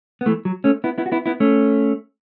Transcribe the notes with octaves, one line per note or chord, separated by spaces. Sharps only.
B3
E3 A3
F#3
A3 C#4
B3 E4
B3 E4
F#4
B3 E4
B3 E4
A3 C#4